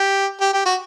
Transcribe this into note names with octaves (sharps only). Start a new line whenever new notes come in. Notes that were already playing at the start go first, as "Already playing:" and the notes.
Already playing: G4
G4
G4
F#4